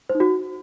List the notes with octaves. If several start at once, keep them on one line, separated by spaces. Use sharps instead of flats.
C5
D#4
F#4